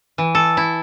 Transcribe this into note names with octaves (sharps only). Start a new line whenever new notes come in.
E3
A4
E4